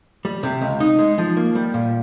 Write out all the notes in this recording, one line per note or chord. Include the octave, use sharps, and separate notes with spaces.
G3
C3
C#2
D#4
G#3
F3
A#3
G3
A#2